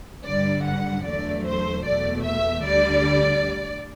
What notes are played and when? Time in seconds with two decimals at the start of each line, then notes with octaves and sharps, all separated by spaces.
0.24 G2 D3 G3 D5
0.65 F#5
1.05 E2 D3 F#3 A3 D5
1.45 C5
1.84 E2 B2 A3 D5
2.24 E5
2.64 D2 D3 G3 D5